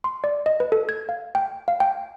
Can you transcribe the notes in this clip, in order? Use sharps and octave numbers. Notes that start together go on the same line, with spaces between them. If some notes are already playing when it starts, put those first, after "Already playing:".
C6
D5
D#5
B4
A4
G#6
F5
G5
F5
G5